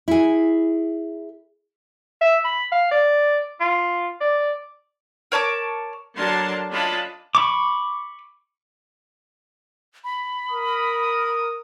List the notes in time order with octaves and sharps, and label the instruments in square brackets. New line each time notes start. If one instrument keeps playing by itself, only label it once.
[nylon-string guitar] E4 G#4
[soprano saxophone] E5
B5
F5
D5
F4
D5
[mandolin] A#4 C#5 A5 D6
[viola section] D3 F#3 D4 A#4 A5 C6
C#4 D4 F4 D#5 A5 B5
[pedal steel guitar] B5 C#6 D6
[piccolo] B5
[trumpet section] A#4 D#6